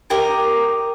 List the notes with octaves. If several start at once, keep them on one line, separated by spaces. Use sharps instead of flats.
G4 A#4 D#5